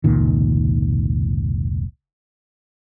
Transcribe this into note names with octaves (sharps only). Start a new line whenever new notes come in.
F1 C#2 A#2 D#3